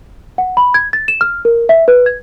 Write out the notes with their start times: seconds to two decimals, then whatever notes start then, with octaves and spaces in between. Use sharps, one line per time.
0.38 F#5
0.57 B5
0.74 G#6
0.93 A6
1.08 E7
1.21 F6
1.45 A#4
1.69 E5
1.88 B4
2.06 G#6